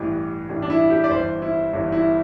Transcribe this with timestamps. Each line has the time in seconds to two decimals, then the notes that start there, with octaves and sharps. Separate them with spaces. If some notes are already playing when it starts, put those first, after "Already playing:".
Already playing: A1 G2 E3
0.49 A1 G2 E3
0.62 D4
0.70 E4
0.90 G4
1.04 D5
1.11 G1 G2 E3 C5
1.42 E4
1.73 G1 G2 E3
1.92 E4